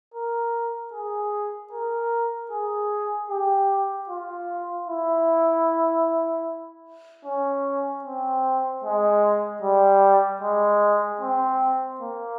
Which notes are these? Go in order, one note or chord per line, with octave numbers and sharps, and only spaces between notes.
A#4
G#4
A#4
G#4
G4
F4
E4
C#4
C4
G#3
G3
G#3
C4
A#3